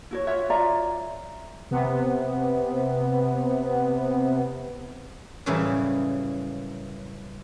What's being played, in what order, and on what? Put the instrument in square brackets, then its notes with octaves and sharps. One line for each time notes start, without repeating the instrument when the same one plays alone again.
[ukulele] E4 F#4 C#5
F4 F#4 C#5 E5
F4 D5 E5 A#5
[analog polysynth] C3 B3
[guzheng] F#2 A2 C#3 E3 G3 E4